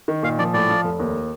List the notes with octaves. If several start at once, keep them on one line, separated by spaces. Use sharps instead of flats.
D#3
A#2 F5
F3 D5
A2 D5
F3
F1
D#2